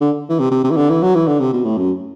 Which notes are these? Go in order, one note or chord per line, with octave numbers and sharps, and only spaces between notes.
D3
E3
C3
C3
C3
E3
D3
E3
F#3
E3
D3
C3
B2
A2
F#2